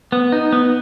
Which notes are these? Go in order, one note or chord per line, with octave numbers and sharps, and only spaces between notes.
B3
D#4
B3